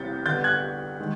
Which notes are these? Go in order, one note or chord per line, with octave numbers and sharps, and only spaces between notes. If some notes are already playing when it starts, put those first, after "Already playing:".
Already playing: C3 E3 G3 C4 G6 A6
D3 G3 B3 G6 A6
F#6 G#6
D#3 G#3